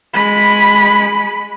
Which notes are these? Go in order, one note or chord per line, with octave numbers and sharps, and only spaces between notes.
G#3 B5